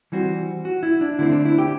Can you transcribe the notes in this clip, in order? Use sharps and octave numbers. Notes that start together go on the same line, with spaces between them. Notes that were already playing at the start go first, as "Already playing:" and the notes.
E3 G3 C4 F#4
F#4
E4
D4
D3 A3 C4 E4
D4
E4
G4